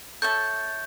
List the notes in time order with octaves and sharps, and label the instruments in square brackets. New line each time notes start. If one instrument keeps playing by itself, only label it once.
[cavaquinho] A4 C#5 E5 A5 [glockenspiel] G6